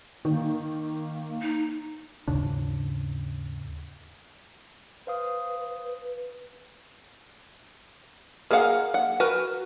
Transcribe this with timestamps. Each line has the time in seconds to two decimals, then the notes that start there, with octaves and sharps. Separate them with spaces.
0.25 D#3 A#3
1.41 D#4
2.28 D#2 G#2 C#3 D4
5.07 B4 C5 F5 D#6
8.51 A#3 G#4 A#4 F5 F#5
8.94 F#5
9.20 F#4 A#4 B4